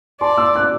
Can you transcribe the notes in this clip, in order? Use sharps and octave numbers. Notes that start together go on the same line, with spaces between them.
D5 A5 C6
C6 E6
D6 F#6